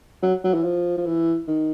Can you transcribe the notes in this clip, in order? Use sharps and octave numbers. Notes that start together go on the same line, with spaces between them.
F#3
F#3
E3
F3
F3
E3
D#3